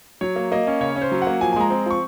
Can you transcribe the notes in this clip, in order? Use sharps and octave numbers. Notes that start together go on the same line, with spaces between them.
F#3 C#5
A#3
A#3 D#5
C#4
C#3 C#5
C#4
C5
F#3
F#5
A#3
F3 G#5
G#5
G#3 A#5
C4
F3 C#6